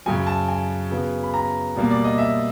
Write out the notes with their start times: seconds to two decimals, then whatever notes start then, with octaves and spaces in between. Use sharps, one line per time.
0.06 F#2 C#3 F#3 G#5
0.27 A5
0.48 G#5
0.91 C#3 F#3 B3
1.23 B5
1.34 A#5
1.76 B2 G3 A#3
1.91 D5
2.04 D#5
2.18 E5